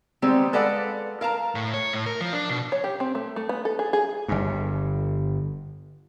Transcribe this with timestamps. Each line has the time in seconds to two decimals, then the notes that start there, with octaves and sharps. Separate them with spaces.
0.22 D#3 G3 G#3 B3 C4
0.53 G#3 A4 B4 D5 F5 F#5
1.21 A#4 F5 A5 A#5
1.55 A2
1.74 C#5
1.93 A2
2.06 A#4
2.21 F3
2.33 D4
2.49 B2
2.72 C#5
2.84 G4
3.00 C4
3.15 A3
3.36 A3
3.49 B3
3.65 A4
3.79 G#4
3.93 G#4
4.28 G1 G2